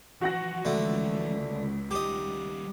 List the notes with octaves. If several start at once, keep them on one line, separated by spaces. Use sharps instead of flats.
E3 F3 F#4 F#5 A#6
C#2 D3 A3
D#3 G3 G4 D#5